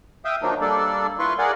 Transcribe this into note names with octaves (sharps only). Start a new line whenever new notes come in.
E5 F5 G5 D#6
D#3 F3 F#3 A#3 D4 D#4
G3 A#3 D4 A4 D5
E4 F4 B4 C6 C#6
G#4 A#4 D5 F5 F#5